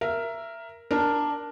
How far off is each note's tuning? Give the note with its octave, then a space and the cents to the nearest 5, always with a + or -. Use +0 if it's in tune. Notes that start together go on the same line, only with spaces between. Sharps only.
A#4 +0 E5 +20
D4 +0 A#4 +0